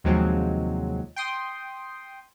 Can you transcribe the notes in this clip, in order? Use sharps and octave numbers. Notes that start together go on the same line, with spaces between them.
D#2 C3 F3 F#3 G#3 C4
G5 C6 D#6